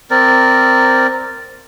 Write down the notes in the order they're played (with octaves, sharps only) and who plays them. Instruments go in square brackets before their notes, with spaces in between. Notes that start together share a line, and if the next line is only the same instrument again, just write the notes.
[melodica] C4 A#4 D5